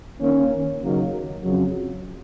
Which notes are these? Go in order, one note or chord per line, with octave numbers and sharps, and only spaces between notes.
D#3 A#3 C#4
D#2 C#3 F#3 A#3 D#4
F2 C#3 F#3